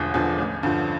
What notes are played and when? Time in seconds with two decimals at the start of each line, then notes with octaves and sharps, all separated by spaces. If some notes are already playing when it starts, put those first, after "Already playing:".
Already playing: E1 E2 D3 F3 D4
0.14 E2 D3 F3
0.38 A1
0.63 G2 D3 F3